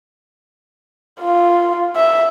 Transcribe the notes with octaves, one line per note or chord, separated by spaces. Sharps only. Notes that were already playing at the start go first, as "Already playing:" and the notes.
F4
E5